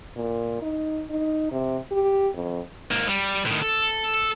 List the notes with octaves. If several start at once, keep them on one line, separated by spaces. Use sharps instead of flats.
A#2
D#4
D#4
C3
G4
F2
G#2 A#3
G3
A2 D#3
A4